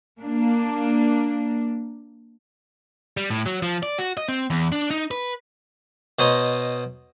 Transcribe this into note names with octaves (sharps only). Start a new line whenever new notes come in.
A#3 D4
G3
A2
F#3
F3
D5
F#4
D#5
C4
E2
D4
D#4
B4
B2 C5 C#5 D#5 A#5 C6